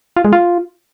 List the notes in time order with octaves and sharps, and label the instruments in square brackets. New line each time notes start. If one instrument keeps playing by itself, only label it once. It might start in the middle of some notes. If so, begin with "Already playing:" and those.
[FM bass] F4
G#3
F4